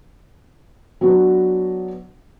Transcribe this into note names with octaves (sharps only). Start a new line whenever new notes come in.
F#3 B3 D4